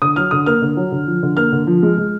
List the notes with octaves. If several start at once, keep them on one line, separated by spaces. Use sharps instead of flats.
D3 D#6
F#3 F6
D3 D#6
A#3 F6
D3
F#3
D3
F3
D3
A#3 F6
D3
F3
G#3
G#3